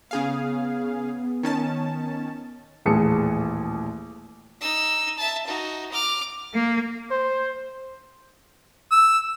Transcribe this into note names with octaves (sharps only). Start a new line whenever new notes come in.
C#3 B3 G#4 F5
D#3 C#4 A5
D#1 A1 E3 G#4 A5 C#7
D#4 E6
E5 A5
D#4 F#4
D6 F6
A#3
C5
E6